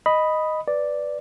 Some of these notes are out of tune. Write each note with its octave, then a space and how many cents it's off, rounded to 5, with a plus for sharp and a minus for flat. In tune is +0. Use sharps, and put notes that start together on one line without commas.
D#5 +0 B5 +0 D#6 +0
B4 +0 D5 +0